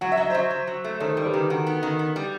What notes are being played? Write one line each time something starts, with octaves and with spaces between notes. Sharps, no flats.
F#3 F#5
E5
F#3 D#5
F#3 C5 E5
F#3
F#3
A3
D#3 A4 C5
G3
G4 B4
D#3
D#3 F#4 A4
B3
D#3
B3
G3